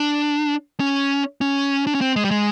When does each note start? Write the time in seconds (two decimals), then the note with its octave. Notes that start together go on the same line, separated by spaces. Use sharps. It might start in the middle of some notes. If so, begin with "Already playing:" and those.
Already playing: D4
0.80 C#4
1.41 C#4
1.87 D4
1.95 C#4
2.01 C4
2.16 G#3
2.25 G3
2.31 G#3